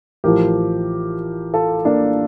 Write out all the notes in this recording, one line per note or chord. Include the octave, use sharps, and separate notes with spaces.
A1 A2 F3 G4 A#4
F4 A4
A#3 D4